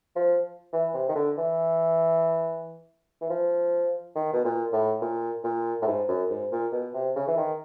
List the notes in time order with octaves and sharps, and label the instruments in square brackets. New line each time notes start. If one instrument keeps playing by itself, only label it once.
[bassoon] F3
E3
C3
D#3
D3
E3
E3
F3
D#3
B2
A#2
A2
A#2
A#2
A2
G#2
F#2
G#2
A#2
B2
C3
C#3
E3
D#3